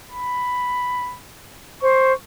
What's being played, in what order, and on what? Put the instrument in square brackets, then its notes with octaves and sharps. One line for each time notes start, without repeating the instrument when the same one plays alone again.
[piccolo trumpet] B5
[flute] C5 [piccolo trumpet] C#6